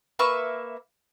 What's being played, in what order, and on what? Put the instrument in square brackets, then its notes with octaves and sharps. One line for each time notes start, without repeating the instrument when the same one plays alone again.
[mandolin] A#3 B4 E5 C#6